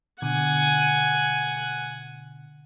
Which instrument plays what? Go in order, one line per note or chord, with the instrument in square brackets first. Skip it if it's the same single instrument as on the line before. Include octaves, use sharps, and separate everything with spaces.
[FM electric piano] B2 D3 [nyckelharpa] F#5 G#5